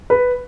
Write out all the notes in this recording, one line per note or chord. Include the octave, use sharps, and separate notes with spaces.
B4